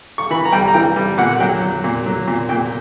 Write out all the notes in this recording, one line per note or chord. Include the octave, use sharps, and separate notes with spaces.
C#6
E3 B5
A#5
G3 G5
A#5
E3 G5
G3
A#2 F#5
F#3 G5
F#3
A#2
F#3
A#2
A#2 G5